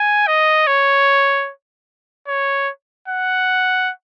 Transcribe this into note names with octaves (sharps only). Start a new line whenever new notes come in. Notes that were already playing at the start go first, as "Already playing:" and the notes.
Already playing: G#5
D#5
C#5
C#5
F#5